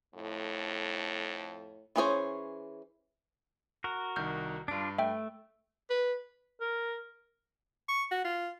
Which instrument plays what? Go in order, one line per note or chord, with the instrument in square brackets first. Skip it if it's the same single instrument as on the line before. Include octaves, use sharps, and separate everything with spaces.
[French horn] F2 [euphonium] A2
[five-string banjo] E3 C#4 G#4 C5 C#5
[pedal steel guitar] F#4 A#4
[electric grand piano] C2 D#3 [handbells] F6 G6
[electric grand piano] G2 D7 [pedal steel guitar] D4 F4
[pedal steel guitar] A3 [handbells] E5 G5
[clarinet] B4
[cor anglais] A#4
[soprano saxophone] C#6
F#4
F4